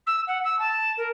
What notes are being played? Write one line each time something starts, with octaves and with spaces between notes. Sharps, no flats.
E6
F#5
E6
A5
A#4